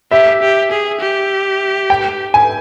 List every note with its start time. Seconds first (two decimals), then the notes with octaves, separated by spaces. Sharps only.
0.11 G4 E5
0.42 G4
0.71 G#4
1.01 G4
1.90 G5
2.34 G#5